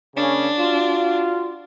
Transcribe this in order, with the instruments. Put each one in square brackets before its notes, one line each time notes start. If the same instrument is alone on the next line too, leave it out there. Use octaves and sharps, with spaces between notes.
[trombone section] C#3 A#3 C#4 [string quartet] D4
[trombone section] F4 F#4